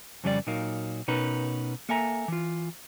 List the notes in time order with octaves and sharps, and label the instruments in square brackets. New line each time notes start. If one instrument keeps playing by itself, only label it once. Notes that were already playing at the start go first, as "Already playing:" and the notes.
[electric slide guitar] F2 C#3 G3 F#4 D5
A#2 F#3 D#4 A#4 F5
B2 C#4 D#4 A#4 B4
A#3 A4 E5 G#5 A#5
E3 F4